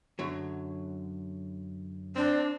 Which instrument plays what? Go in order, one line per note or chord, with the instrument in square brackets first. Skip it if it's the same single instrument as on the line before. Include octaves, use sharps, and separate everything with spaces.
[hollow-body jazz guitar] F#2 D3 F#3
[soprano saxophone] C4 [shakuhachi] D4